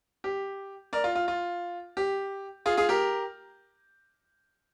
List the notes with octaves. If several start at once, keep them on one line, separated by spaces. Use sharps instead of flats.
G4
A#4 D5
F4
F4
F4
G4
F4 G#4
F4 G#4
G4 A#4